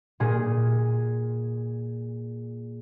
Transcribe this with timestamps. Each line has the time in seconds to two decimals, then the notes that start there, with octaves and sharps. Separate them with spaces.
0.20 A#2 G#4